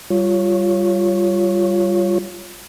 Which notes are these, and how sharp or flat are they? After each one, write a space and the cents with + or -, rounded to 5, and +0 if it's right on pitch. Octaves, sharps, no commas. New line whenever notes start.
G3 +0 F4 +0 C#5 +0